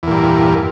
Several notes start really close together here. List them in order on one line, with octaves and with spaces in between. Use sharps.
E2 A#2 G2